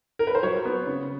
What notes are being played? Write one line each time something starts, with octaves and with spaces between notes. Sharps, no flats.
A#4
B4
C5
F#3 C#5
B3
C#3